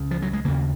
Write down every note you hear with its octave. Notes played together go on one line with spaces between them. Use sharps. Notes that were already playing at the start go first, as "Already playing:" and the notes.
Already playing: C#2 C#3
F3
F#3
G#3
D#2 C#3 A#3